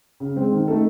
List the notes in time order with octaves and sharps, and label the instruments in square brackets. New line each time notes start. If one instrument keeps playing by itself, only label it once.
[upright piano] C#3
G#3 C4
D#3
A3 D#4 A4